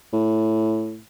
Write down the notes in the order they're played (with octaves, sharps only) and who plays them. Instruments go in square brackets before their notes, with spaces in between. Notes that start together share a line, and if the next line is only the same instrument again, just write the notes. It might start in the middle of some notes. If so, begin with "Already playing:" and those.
[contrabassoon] A2